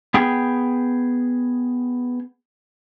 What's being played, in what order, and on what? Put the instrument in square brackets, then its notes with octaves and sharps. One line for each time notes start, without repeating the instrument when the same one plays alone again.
[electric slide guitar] B3 G#4 G5